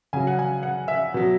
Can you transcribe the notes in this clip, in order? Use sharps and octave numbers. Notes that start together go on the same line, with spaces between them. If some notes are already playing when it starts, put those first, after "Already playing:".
C#3 F#3 G#5
F#5
G#5
F#5
E5
B2 F#3